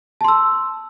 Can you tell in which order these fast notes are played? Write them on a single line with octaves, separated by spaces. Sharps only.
A5 C6 E6